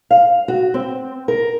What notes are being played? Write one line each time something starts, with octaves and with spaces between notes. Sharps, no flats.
F5
F#4
C4
A#4